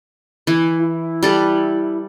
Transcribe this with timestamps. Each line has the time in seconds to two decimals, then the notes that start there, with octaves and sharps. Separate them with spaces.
0.47 E3
0.81 E4
1.23 G3 A4 B4